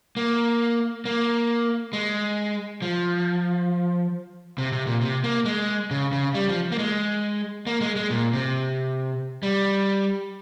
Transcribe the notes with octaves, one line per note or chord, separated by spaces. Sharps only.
A#3
A#3
G#3
F3
C3
C3
A#2
C3
A#3
G#3
C#3
C#3
G3
F3
A#3
G#3
A#3
G#3
G#3
A#2
C3
G3